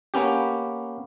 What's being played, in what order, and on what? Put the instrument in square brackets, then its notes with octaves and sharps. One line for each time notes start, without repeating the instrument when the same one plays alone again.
[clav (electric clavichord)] A#3 B3 C#4 G4